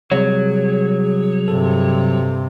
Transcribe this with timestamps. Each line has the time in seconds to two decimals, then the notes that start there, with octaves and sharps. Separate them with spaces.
0.11 C3 F#3 G3 G#4 C#5
1.48 G2 C3 A4